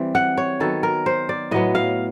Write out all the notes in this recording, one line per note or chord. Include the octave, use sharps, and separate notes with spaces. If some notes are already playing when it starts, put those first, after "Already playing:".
Already playing: E3 G3 C4
F#5
C#5
D#3 F#3 B3 A4
A#4
C5
D5
A2 F#3 B3 D#5
F5